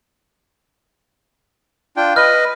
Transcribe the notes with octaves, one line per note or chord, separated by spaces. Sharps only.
D4 F4 G5
B4 D#5 F6